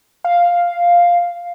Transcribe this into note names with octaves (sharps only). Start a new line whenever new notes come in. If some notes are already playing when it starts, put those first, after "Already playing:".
F5